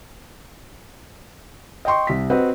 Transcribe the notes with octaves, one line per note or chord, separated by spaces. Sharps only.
D#5 G5 C6 C#6
C2 B6
C4 F#4 B4 D#5